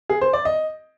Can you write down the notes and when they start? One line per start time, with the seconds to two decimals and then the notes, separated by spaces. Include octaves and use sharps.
0.09 G#4
0.21 C5
0.33 D5
0.45 D#5